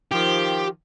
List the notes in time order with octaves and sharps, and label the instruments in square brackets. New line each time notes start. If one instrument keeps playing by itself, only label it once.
[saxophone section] D#3 F3 [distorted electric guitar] G4